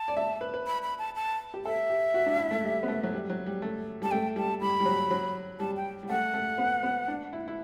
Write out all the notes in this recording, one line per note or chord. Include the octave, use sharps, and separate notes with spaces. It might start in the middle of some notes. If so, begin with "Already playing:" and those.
Already playing: A5
D5
E5
B4
B4
B5
B5
A5
A5
G4
A4 E5
G4
F#4
D4
E4
A3
G3
B3
A3
F#3
G3
F#3
G3
A3
G3 A5
A3 G5
G3 A5
G3 B5
G3
F#3
F#3
G3 A5
G5
G3
A3 F#5
A3
B3
B3
D4
E4
E4